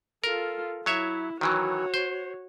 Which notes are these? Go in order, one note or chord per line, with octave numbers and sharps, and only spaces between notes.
F4 A4 A#4
F#3 E4 C#5 E5
D#3 E3 F#3 F#4 C#5
C5